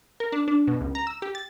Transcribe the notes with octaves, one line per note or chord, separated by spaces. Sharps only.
A#4
D4
D4
B2
C#2
A#5
E6
G4
A6